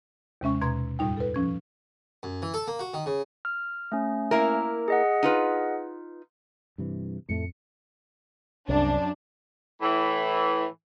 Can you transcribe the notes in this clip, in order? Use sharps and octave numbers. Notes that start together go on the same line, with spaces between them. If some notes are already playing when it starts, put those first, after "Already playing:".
D#2 C3 G#3 C#4 E5 C#6
D#2 B2 A#5 C6 G#6
F2 A2 G3 D#4 G5
A4 B4
F3 C#4 G#6
F#2
E3
A4
A#3
F#4
D#3
C#3
F6
A3 C#4
A#3 E4 A#4
G#4 D#5 F#5
D#4 F4 B4
G2 C3 E3
F2 A2 A3 C#7
C2 F#2 D4
A2 E3